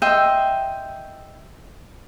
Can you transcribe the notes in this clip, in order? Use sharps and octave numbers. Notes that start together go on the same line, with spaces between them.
D#5 E5 G5 C6